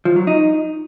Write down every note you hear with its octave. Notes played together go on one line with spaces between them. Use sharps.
F3
F#3
D#4